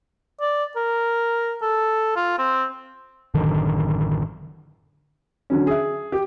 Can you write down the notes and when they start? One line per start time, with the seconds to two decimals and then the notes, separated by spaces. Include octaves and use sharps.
0.40 D5
0.76 A#4
1.62 A4
2.16 F4
2.38 C4
3.34 A1 F#2 D3 D#3
5.50 D3 F#3 C#4
5.67 G#4 E5
6.12 G4